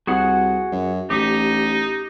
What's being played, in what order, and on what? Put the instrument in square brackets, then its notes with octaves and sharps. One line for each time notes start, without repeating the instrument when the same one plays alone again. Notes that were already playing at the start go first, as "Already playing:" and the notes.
[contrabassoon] C2 [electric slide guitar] F#4 G#4 F#5
[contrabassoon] F#2
[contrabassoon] A1 [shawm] D#4 [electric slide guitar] G4